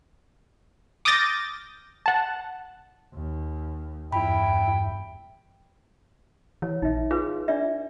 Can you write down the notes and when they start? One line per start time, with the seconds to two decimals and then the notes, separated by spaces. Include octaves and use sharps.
1.05 D6 D#6 F6 G6 A6 A#6
2.06 F#5 A5
3.14 D#2
4.12 E2 G2 E4 G5 B5
6.62 E3 C#5
6.82 A#1 D#4 E5
7.11 F4 G#4 B4
7.48 D4 D5 E5